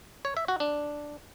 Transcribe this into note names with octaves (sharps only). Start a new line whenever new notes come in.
C#5
E5
F#4
D4